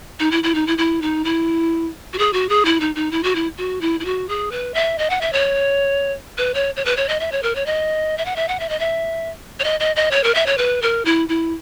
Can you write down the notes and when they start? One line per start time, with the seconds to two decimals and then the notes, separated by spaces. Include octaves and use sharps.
0.20 D#4
0.31 E4
0.43 E4
0.55 D#4
0.67 E4
0.78 E4
1.02 D#4
1.25 E4
2.13 F#4
2.19 G#4
2.33 F#4
2.49 G#4
2.65 E4
2.80 D#4
2.95 D#4
3.11 E4
3.23 F#4
3.35 E4
3.58 F#4
3.81 E4
4.00 E4
4.05 F#4
4.29 G#4
4.51 B4
4.74 E5
4.98 D#5
5.10 F#5
5.21 E5
5.33 C#5
6.38 B4
6.54 C#5
6.76 C#5
6.85 B4
6.97 C#5
7.09 D#5
7.20 E5
7.32 C#5
7.43 A#4
7.55 C#5
7.66 D#5
8.18 E5
8.25 F#5
8.36 E5
8.48 F#5
8.60 E5
8.69 D#5
8.79 E5
9.60 C#5
9.64 D#5
9.80 D#5
9.96 D#5
10.11 C#5
10.24 A#4
10.35 E5
10.46 C#5
10.58 B4
10.82 A#4
11.05 E4
11.29 E4